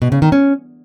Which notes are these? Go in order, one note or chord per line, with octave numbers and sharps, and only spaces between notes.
B2
C#3
D#3
C#4